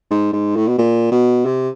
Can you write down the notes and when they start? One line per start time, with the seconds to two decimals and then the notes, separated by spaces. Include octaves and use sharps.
0.11 G#2
0.33 G#2
0.56 A2
0.68 B2
0.78 A#2
1.12 B2
1.45 C3